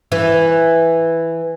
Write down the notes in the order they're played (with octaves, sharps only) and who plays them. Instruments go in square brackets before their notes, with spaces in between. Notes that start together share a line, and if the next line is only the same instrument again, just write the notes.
[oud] E3